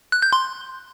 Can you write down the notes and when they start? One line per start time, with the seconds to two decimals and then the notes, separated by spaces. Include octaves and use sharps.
0.12 F#6
0.22 G6
0.33 C6